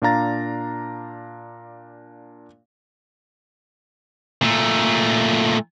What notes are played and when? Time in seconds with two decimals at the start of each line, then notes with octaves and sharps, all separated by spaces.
0.02 A#2 D4 F5 A#5 A6
4.42 A#2 A3